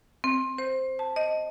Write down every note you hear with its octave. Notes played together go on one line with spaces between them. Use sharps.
C4
C5
A5
D#5